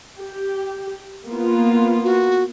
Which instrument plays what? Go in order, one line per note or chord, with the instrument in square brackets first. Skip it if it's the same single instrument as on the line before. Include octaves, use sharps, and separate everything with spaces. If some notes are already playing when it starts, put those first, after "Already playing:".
[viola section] G4
A#3 B3 F4
[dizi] F#4